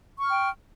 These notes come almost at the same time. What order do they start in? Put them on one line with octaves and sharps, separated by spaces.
C#6 F6 G5